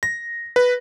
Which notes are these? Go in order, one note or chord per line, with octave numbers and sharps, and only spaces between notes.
A#6
B4